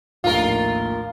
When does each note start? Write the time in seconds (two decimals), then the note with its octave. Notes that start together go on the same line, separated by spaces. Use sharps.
0.24 A#1 D#2 A2 F4 A#4